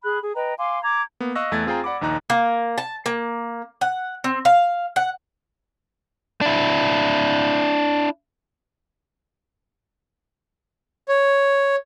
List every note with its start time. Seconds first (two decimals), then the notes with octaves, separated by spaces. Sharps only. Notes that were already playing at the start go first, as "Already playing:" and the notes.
0.05 G#4 B5 F#6
0.22 G#4
0.35 B4 D#5 G5 A#5
0.58 F5 G#5 C6 D6
0.83 A#5 D6 G#6
1.20 A#3 B3
1.35 D#5 F5 C#6 E6 F#6 A#6
1.52 E2 A3 G#6 A6
1.66 C4 F4 G#4 C5 G5 A#5
1.84 D5 F#5 B5 D6
2.01 A#1 D#2 D#4 A#5 F#6
2.30 A#3
2.78 A5
3.06 A#3
3.81 F#5
4.24 C4
4.45 F5
4.96 F#5
6.41 D4 E4
11.08 C#5